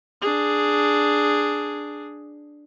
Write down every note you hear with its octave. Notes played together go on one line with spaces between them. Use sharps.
D4 G#4